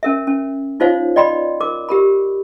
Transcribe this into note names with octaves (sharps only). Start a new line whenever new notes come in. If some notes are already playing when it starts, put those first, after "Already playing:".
C#4 A#4 E5
C#4
D#4 F4 C5 C#5 F5
D5 D#5 G5 B5 C6
A#4 D6
G4 A#4 B5